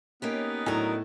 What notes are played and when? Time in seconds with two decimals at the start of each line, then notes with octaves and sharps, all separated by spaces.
0.22 A#3 B3 C#4 D#4 G4
0.66 A2 F#3 D4 A#4